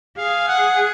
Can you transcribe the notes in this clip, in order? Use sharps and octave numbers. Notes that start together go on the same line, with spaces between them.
G#4 F5
F#5